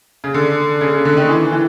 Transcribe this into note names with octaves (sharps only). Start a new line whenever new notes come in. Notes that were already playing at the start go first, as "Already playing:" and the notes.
C#3
D3
C#3
C#3
D3
D#3
E3
E3